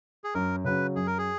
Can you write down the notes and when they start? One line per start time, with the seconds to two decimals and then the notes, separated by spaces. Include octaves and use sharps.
0.24 G#4
0.34 F#2 A#4
0.64 C#3 F#3 B4
0.96 F#2 G#4
1.07 A#4
1.18 G#4